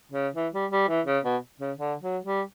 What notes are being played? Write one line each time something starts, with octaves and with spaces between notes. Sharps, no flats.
C#3
E3
G3
G3
E3
C#3
B2
C#3
D3
F#3
G3